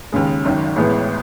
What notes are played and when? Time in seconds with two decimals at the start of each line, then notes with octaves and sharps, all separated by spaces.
0.12 D#2 C#3 G#3
0.45 G#1 F#2 D#3
0.76 A1 A2 G#3 B3